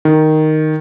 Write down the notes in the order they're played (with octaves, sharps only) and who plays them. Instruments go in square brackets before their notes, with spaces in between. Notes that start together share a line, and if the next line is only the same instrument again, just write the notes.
[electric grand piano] D#3